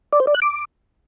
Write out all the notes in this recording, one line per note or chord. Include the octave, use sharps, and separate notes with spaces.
D5
C5
D5
F#6
D6